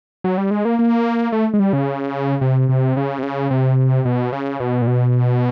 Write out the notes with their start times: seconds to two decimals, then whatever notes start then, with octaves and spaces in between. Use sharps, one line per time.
0.24 F#3
0.38 G3
0.51 G#3
0.65 A#3
0.79 A#3
1.32 A3
1.54 G#3
1.59 G3
1.73 C#3
2.41 C3
2.69 C3
2.97 C#3
3.19 C3
3.23 C#3
3.51 C3
4.05 B2
4.32 C#3
4.60 B2
4.82 A#2
4.87 B2